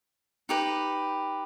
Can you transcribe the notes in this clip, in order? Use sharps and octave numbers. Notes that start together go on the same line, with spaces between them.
D#4 G4 B4